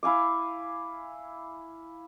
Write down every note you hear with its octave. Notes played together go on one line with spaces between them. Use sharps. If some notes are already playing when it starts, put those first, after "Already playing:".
E4 F5 G#5 D6